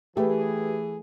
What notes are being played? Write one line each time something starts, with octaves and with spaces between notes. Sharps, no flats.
E3 A3 G4 G#4 B4